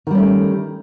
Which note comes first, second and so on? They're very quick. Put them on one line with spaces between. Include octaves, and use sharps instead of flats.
D#3 G3 C#4 A3